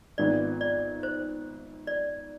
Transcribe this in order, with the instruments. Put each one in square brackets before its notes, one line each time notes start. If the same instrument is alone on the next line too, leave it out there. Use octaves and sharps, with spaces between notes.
[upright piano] G#1 G#2 F3 B3 [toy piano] D5
[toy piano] D5
C5
D5